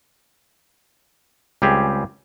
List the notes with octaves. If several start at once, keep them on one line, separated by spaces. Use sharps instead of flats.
C#2 G3 C4 G4 G#4